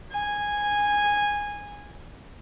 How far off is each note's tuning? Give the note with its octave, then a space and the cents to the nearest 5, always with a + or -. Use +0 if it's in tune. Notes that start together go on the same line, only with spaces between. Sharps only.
G#5 -10